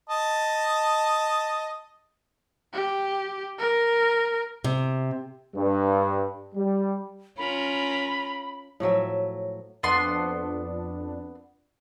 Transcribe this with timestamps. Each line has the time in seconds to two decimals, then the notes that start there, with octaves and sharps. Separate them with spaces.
0.10 D#5 A5
2.73 G4
3.59 A#4
4.64 C3
5.55 G2
6.55 G3
7.38 C#4 F4 A#4 B5
8.80 A2 F3 F#3 E5
9.83 F2 B3 D4 F#5 C6